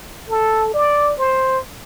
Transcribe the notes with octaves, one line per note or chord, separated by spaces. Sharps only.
A4
D5
C5